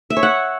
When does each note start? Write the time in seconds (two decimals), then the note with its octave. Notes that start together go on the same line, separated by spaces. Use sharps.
0.10 E5
0.17 C#5
0.23 F#5